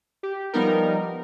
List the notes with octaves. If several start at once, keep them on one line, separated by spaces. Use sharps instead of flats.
G4
F3 G3 B3 D#4 A#4